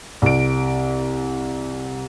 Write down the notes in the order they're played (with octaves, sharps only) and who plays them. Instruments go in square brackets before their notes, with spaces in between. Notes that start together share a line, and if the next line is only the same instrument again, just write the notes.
[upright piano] C2 D7